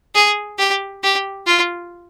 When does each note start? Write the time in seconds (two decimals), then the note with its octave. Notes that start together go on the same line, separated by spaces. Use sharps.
0.15 G#4
0.58 G4
1.03 G4
1.46 F4